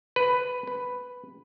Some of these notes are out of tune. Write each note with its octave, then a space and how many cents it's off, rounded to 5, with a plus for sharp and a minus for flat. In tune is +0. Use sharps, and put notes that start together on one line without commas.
B4 +10
B4 +5